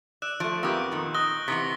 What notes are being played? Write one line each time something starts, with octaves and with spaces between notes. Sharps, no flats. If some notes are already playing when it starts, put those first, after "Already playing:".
D5 E6 F#6 E7
F3 A3 C#6 F#6 D7
F2 A#3 B3 G4 E6 G6
A#2 D#3
D#5 F#6 A#6 G7
C3 E3 B3 B6 C#7